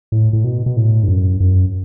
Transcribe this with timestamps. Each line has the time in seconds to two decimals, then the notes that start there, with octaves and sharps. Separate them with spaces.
0.12 A2
0.33 A2
0.44 B2
0.66 B2
0.77 A2
1.03 G2
1.08 F#2
1.40 F#2